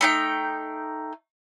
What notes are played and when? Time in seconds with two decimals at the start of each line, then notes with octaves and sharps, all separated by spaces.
0.01 A3 D#4 G5